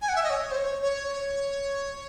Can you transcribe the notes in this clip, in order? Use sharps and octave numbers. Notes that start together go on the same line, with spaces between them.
G#5
F#5
E5
D#5
C#5
C5
C#5
C#5
C#5